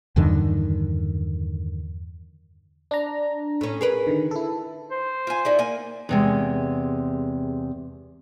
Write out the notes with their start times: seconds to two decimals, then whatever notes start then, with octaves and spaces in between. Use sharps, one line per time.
0.16 E2 G2 D3 D#3
2.91 D4 A#5
3.61 A2 C#4
3.81 G#4 A#4 B4
4.07 D3 D#3
4.31 E4 A4
4.91 C5
5.27 F4 G#5
5.45 D#4 E4 D5
5.59 A#3 G#5
6.09 E2 C3 G#3